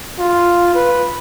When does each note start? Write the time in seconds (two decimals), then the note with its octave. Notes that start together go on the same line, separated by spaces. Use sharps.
0.19 F4
0.75 B4